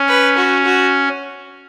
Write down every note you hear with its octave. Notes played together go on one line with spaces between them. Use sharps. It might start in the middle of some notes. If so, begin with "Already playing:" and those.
Already playing: C#4
B4
F#4
F#4